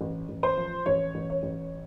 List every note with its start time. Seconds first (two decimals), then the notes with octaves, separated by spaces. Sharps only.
0.01 A1
0.29 A1
0.43 C5
0.57 F3
0.86 A1 C#5
1.15 A1
1.30 C#5
1.43 A1